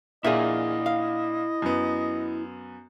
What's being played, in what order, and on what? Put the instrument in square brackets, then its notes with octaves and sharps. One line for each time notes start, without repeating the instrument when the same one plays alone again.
[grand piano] A#2 A#3 D4 [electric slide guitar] E4 F#5 [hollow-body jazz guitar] G#4 E5 [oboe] D#5
[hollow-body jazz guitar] F5
[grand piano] F#2 B3